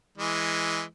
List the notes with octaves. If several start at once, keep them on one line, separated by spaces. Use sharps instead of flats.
E3 G#3